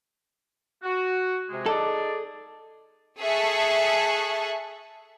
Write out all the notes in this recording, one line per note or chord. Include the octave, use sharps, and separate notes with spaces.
F#4
C3 G#3
D#4 G#4 A4 D5
G#4 A4 E5 A5 C#6 F#6